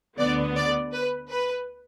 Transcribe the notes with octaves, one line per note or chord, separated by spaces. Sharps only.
D2 D3 B3 D5
D5
B4
B4